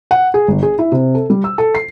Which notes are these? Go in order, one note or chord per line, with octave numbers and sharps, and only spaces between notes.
F#5
G#4
G1
G#4
E4
C3
A4
G3
E6
A4
C7